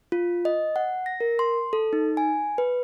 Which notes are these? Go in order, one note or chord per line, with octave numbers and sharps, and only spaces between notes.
F4
D#5
F#5
A#6
A#4
C6
A4
D#4
G#5
B4